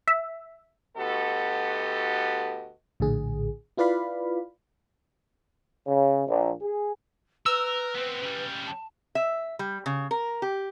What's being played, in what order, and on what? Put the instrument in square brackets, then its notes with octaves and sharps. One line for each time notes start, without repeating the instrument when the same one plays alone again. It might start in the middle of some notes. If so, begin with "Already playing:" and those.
[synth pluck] E5
[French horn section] D2 B3 F#4 G4 A4 D#5
[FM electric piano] A#1 A2 D3 G#4
E4 F4 B4 D5 F5 B5
[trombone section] C#3
A#1
G#4
[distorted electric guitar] A#4 [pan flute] B4 [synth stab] E6
[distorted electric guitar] B3 C4
C#3 G3
[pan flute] A5
[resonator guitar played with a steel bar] E5
G3
C#3
A#4
G4